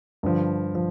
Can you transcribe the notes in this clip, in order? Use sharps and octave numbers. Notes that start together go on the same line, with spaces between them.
G2 D3 F3
F3